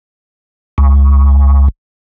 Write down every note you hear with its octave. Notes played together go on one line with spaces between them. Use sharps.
C#2